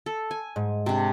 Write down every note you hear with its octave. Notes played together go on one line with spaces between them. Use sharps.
A4
G#5
G#2
C3 D4